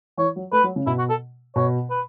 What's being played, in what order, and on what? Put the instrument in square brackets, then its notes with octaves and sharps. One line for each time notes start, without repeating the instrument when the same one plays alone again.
[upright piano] E3 [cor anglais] C#5
[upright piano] F#3
[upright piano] A3 [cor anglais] B4
[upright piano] F#3
C#3
[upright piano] B2 [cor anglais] E4
[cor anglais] F#4
A4
[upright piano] B2 [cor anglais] C#5
[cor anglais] B4